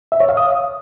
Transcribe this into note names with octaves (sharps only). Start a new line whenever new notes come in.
E5
C#5
F5
D#6